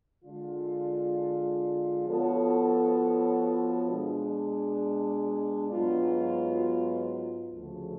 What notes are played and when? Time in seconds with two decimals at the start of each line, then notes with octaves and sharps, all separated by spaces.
0.23 D3 G#3 D4 F4
2.05 F3 B3 F#4 A4 C#5
3.88 B2 G#3 D4
5.71 G#2 F#3 B3 F4
7.53 D2 C#3 F3 A3